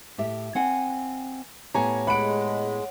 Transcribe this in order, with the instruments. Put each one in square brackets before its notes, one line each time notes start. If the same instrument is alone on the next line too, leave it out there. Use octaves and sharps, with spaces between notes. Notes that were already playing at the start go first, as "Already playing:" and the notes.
[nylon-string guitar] A2 G4 E5
C4 F#5 G#5
[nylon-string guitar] A2 B3 G4 [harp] C#5 [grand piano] G#5 A#5
[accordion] G#3 [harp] F#5 [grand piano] B5 D7